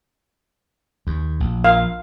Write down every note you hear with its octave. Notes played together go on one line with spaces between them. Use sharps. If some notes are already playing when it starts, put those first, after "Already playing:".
D#2
A#1
F5